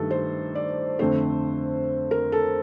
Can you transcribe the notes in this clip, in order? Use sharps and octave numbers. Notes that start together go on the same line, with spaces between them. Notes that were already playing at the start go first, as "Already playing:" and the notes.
Already playing: G2 D#3 A3 A4
C5
D5
F2 D3 A3 C4 C5
A#4
A4